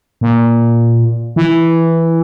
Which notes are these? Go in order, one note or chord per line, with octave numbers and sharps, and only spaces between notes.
A#2
E3